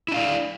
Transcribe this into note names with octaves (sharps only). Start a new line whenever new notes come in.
D4 E4 D5 F5